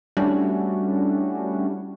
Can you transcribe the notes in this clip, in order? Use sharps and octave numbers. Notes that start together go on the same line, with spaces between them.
G3 A3 C#4 D4 E4 F#4